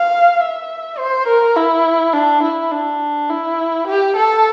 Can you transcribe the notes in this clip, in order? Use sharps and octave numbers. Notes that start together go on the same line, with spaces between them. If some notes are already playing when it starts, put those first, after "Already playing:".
Already playing: F5
E5
C5
A#4
E4
D4
E4
D4
E4
G4
A4